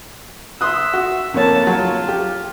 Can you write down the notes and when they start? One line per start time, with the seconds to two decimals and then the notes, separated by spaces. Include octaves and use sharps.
0.61 E5 C6 D#6 F#6
0.93 F#4
1.34 F2 A#3 C#5 A5
1.67 F#3 F4
2.08 G4